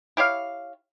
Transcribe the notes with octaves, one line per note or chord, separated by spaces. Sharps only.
E4 G4 C#5 F5